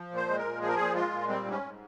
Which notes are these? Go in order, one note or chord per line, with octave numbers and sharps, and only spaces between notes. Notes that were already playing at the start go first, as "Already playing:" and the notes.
Already playing: F3
A#2 C5
G#3
A#4
A#2
F3 G#4
A#4
A#2 G#4
G#3 F4
A#2
G3 C4
G#2
C#4
G#2